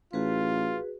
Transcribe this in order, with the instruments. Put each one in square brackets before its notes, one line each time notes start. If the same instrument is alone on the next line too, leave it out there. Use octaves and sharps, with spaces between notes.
[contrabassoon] A1 [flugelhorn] F4 [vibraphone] F#4 G#4 B4